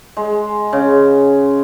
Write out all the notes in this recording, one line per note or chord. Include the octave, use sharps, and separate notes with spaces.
G#3
C#3